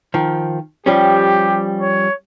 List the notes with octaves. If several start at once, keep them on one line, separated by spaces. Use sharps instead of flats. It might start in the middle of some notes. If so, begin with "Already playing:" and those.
D#3 F3
F3 G3 C#4 G4
C#5